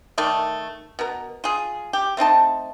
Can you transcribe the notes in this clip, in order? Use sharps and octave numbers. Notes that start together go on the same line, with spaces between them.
D#3 A3 A4 D5
B2 A#4
F4 G#4
G4
A3 C4 D#4 A5